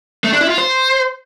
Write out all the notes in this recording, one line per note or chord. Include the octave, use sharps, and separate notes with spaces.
A3
D4
E4
F4
C5